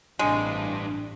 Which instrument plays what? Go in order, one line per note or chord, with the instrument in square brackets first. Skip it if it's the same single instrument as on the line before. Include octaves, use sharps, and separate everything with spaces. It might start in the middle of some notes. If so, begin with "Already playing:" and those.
[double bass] A1 C3 [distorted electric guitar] G2 [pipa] G#3 [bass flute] D4